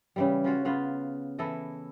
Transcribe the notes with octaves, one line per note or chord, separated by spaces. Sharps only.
C#3 E3 G3
C#4 F4 F#4
C#3 B3 F4
E3 E4 A4 D#5